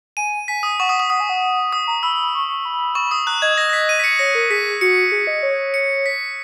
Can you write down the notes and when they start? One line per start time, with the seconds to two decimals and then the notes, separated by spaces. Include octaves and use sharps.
0.17 G#5 D#7
0.48 G#5 B6
0.63 D#6
0.80 F#5 C#6
0.89 D#6
1.00 D#6
1.10 F#5 D#6
1.20 G#5
1.29 F#5
1.72 D#6
1.87 A#5
2.03 B5 E6
2.34 C#6
2.49 C#6
2.65 B5
2.95 C#6
3.11 D#6
3.26 A#5 F#6
3.42 D#5 G#6
3.58 D#5 A#6
3.69 A#6
3.73 B6
3.89 D#7
3.99 B6
4.04 C#7
4.19 C#5 A#6
4.35 A#4
4.50 G#4 B6
4.81 F#4 C#7
5.12 G#4
5.27 D#5
5.43 C#5
5.74 C#7
6.06 B6